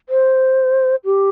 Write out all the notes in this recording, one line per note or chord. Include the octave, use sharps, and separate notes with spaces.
C5
G4